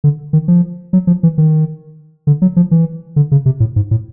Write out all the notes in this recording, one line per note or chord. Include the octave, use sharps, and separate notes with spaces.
D3
D#3
F3
F#3
F3
E3
D#3
D3
F#3
F3
E3
D3
C#3
C3
A2
G#2
A2